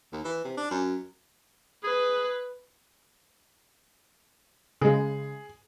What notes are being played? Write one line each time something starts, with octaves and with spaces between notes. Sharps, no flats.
D#2
E3
C3
D4
F#2
G#4 B4
C#3 G#3 G#4